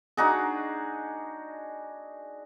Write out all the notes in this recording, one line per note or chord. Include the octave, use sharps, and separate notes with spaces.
D4 D#4 F#4 G#4